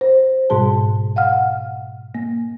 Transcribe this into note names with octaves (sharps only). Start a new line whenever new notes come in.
C5
G#2 B2 G3 G#4 A5
F5 F#5 F6
A#3